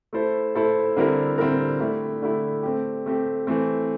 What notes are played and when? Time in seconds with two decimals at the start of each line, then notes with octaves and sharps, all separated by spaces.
0.13 A3 E4 A4 C5
0.55 A3 E4 A4 C5
0.97 D3 G3 C4 E4 A#4
1.38 D3 G3 C4 E4 A#4
1.80 D3 A3 E4 G4
2.22 D3 A3 E4 G4
2.63 A3 C4 G4
3.06 A3 C4 G4
3.47 E3 A3 C4